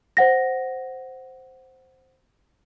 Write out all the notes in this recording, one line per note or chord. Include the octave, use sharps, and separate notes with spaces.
C5 F#5 A#6